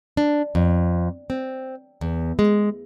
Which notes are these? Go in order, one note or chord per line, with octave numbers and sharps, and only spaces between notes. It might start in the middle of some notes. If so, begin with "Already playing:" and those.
D4
F2
C4
E2
G#3